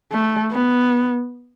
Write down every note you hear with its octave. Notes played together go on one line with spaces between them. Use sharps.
A3
B3